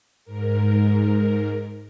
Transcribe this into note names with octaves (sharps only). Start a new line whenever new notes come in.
G#2 A#4